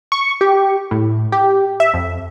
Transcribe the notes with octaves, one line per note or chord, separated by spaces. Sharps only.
C#6
G4
A2
G4
E5
F2